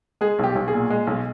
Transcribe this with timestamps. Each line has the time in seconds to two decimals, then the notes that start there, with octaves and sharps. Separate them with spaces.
0.21 G#3 G#4
0.39 B1 G4
0.55 B1
0.68 G#4
0.73 A#2
0.90 G#3
1.07 B1